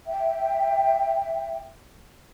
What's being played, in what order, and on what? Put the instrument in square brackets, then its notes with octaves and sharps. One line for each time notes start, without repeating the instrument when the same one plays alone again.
[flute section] E5 G5